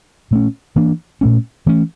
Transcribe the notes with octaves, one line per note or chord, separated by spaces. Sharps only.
A#2 A3 C#4
E3 A#3 D4
A#2 A3 C#4
E3 A3 C#4